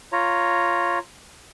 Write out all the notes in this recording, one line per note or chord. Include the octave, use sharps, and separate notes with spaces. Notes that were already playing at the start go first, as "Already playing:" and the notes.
F4 C#5 A#5